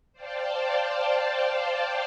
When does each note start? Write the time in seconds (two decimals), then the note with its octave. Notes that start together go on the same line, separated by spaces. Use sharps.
0.13 C5 D5 F5 G5 A5